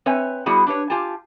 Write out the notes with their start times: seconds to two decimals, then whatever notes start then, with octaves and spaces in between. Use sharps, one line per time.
0.06 C4 B4 C#5 E5 G#5
0.46 G3 B3 E4 F#4 G#4
0.67 D4 G4 B4 C#5
0.90 F4 G4 G#5 A5